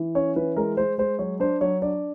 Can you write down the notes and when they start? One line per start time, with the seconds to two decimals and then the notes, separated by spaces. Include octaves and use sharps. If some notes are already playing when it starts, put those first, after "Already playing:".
Already playing: E3
0.15 C#4 C#5
0.36 E3 B4
0.57 G#3 A#4
0.77 G#3 C5
0.98 G#3 C5
1.19 F#3 C#5
1.40 D4 C5
1.61 F#3 C#5
1.82 D4 D5